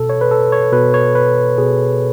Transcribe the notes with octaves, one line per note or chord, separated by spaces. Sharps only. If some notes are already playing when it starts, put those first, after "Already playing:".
Already playing: B2 A4
C#5
B4
A4
C#5
B2 B4
C#5
B4
B2 G#4